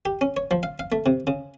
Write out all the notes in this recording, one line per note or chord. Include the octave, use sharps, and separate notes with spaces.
G4
C#4
C#5
F3
F5
F5
A3
C3
C#3